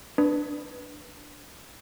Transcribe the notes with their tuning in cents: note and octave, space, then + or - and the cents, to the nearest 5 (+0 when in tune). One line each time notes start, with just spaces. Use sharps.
D4 +0 B4 +0